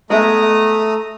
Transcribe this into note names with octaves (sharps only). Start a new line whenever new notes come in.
G#3 A3 B3 E5 A#5 D#6